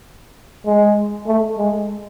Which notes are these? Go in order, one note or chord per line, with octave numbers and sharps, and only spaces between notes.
G#3
A3
G#3